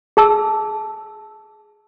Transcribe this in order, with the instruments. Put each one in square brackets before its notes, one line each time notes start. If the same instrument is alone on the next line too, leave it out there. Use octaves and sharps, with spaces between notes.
[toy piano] G#4 A5 E6